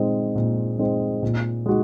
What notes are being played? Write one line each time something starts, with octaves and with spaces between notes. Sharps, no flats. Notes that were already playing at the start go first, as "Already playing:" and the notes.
Already playing: A#2 G#3 C4 D#4
A#2
G#3 C4 D#4
A#2
G#3 D#4 F#4